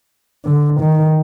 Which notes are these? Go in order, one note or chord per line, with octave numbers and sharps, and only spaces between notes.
D3
D#3